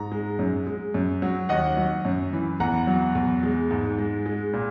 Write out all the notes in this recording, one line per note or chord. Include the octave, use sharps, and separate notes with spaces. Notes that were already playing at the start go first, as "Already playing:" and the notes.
Already playing: G#2 A#5
G#3
F#2
G#3
F#2
F#3
D#2 D#5 F#5
F#3
F#2
E3
E2 F#5 A#5
F#3
E2
G#3
G#2
G#3
G#3
A#2